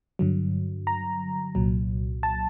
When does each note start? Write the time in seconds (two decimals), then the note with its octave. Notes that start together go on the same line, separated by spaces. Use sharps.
0.19 G2 D3 F#3
0.87 A#5
1.55 C2 A#2 F#3
2.23 A5